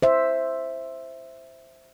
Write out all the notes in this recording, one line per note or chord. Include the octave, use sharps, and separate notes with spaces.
C5 E5